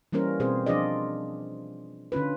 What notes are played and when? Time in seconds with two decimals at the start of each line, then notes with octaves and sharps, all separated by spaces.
0.13 E3 G3 A#3 C#4 A#4 C5
0.40 B2 C4 G#4 C5
0.66 F3 D4 F4 G#4 D5 D#5
2.12 D3 C#4 F4 B4